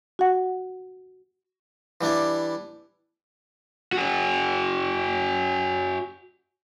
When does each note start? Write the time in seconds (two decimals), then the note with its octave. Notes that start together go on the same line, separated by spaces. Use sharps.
0.19 F#4 F#5
2.01 E3 G3 D4 E4
3.93 F#4 G#4